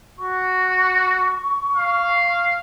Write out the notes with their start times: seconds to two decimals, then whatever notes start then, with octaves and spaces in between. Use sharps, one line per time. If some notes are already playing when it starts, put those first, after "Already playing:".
0.19 F#4 C#6
1.76 F5